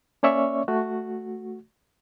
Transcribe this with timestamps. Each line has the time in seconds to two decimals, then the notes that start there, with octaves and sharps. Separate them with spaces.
0.23 A#3 C#4 C#5 D5 E5 C#6
0.68 A3 F#4